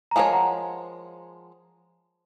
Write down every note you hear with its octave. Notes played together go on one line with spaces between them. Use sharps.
A#5
F3 G#3 D#4 A#4 C#5 F5 G#5
F#5 A#5